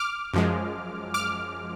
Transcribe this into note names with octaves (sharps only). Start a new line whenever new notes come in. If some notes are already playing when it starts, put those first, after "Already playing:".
Already playing: D6 F6
F#2 F3 G#3
D6 F6